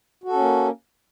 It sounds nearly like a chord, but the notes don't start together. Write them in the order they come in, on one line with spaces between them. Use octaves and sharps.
F#4 A4 C#4 A#3